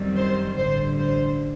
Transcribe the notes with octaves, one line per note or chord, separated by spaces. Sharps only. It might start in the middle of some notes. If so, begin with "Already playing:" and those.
Already playing: F#2 D#3 G3 C4
C5
A1 G2 D3 C5
C5